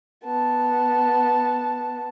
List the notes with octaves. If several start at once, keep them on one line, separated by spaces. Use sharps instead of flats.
B3 A5